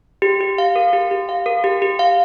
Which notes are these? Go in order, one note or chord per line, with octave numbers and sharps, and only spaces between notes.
G4
G4
F5
A#4
G4
G4
F5
A#4
G4
G4
F5